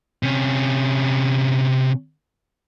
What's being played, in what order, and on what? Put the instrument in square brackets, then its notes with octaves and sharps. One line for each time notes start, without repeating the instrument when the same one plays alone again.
[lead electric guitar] C3 C#4